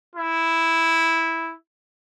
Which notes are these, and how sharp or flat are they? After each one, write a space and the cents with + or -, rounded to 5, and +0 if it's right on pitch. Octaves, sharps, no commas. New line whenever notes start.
E4 -5